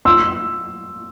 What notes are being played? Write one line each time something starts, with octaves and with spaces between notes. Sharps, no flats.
C6 E6